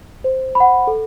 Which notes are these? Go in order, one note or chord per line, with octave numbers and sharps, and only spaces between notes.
C5
B5
F#5
A4